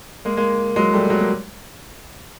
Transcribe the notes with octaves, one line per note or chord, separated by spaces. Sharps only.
G#3 A#3
G#3 A#3
F#3 G#3
G3 A3
F#3 G#3
A#3